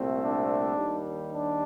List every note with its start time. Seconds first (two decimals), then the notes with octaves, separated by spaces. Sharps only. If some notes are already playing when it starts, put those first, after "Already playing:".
Already playing: C2 A#2 A3 C4
0.21 D4
0.75 D#2 D#3 G3
1.31 D4